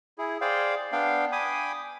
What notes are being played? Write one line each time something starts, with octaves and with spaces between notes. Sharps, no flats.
E4 G#4
G#4 C5 D5 F5 G5
B3 D4 F5 G5
G5 G#5 B5 D6 D#6